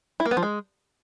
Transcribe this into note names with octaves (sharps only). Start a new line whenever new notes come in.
E4
A#3
B3
F3
G#3